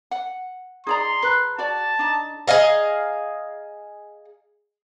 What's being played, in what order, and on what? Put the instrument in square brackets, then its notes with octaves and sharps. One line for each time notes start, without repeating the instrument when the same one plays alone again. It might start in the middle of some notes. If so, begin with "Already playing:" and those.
[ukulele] F#5
[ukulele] D#4 D5 A#5 [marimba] G#4 D#6 [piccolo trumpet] C6
[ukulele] B4 [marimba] A#5 F#6
[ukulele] F#4 D5 [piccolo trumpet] A5
[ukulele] D4 D#4
[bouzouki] G#4 D#5 F5 A#5